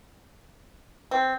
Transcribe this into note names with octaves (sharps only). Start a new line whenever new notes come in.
C4